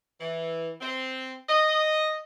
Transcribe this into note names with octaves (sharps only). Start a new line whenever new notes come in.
E3
C4
D#5